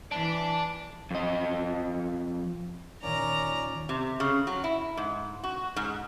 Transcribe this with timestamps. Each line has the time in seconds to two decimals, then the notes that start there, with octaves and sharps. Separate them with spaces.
0.12 E3 D5 A5
1.11 F2 D#5
3.03 D#2 A#2 D#3 C#4 D5 A#5
3.89 C3
4.20 C#3
4.47 F#3
4.64 E4
4.97 G#2
5.44 F#4
5.76 G#2